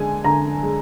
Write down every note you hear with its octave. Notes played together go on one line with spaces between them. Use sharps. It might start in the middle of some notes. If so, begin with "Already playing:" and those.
Already playing: D3 G#3 G#5
D3 A#5
G#3